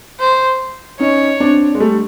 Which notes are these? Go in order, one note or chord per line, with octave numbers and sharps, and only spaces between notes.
C5
C#4 D#4 C#5
C4 D4
G#3
G3 A3